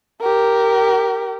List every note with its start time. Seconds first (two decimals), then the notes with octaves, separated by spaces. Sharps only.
0.21 G4 A#4